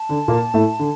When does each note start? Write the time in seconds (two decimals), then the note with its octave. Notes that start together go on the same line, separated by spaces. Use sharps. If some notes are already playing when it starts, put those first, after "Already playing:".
Already playing: A5
0.09 D3 D4
0.28 A#2 A#3
0.54 A2 A3
0.79 D3